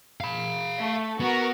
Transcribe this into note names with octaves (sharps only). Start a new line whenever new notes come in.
F5 B5
A3
B3 F#4 A#4